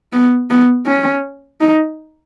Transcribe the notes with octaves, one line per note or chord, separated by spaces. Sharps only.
B3
B3
C#4
D#4